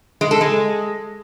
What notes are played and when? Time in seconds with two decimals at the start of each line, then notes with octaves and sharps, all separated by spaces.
0.21 G#3
0.31 A4
0.41 G#3